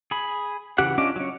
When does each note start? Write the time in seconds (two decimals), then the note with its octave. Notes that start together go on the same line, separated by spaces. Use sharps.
0.11 G#4 B5
0.78 C#3 E3 G4 F#5 F#6
0.98 C#4 D4 F4 D#5 D6
1.16 F#3 C#4